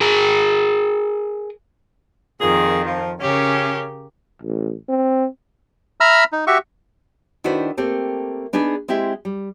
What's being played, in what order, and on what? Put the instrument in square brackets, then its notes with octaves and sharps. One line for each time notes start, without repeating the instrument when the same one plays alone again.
[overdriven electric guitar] G#4 A#4
[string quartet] F2 D#3 [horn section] A#2 F4 G#4
[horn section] F3
[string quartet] C#3 G4 A#4 [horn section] C#4
[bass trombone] A1
C4
[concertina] E5 A#5 B5 E6 F6
D#4
F#4 G4 E5 C#6
[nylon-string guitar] D#3 D4 E4 F#4 B4 C5
A3 A#3 C4 G4 A4
B3 D4 D#4 G#4 B4
G#3 C4 E4 G4 E5
G3